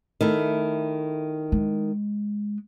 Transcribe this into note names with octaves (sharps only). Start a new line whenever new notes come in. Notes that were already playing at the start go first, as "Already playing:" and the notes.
D#3 A3 E4
G#3